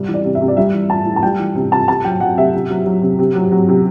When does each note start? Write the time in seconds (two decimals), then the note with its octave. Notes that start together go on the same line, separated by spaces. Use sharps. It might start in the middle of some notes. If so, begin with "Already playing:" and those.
Already playing: C3 G3
0.08 E3
0.14 D5
0.24 C3
0.35 E5
0.41 C3
0.48 D5
0.57 G3 E5
0.74 E3
0.90 A2 A5
1.06 A2
1.16 A5
1.23 G3 G5
1.39 E3
1.55 C3
1.72 C3 A5
1.88 C3 A5
2.04 F#3 G5
2.20 F#3 F#5
2.37 C3 E5
2.54 C3
2.70 F#3
2.86 F#3
3.02 C3
3.19 C3
3.35 F#3
3.52 F#3
3.69 C3